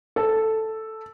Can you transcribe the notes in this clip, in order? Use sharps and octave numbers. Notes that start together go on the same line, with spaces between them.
A4